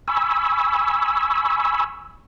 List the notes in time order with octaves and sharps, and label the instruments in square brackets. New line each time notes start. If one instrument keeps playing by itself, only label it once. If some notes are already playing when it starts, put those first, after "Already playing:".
[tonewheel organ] G#5 B5 C#6 E6